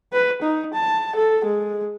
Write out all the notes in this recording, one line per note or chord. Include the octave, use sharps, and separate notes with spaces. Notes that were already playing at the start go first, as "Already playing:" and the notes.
B4
D#4
A5
A4
G#3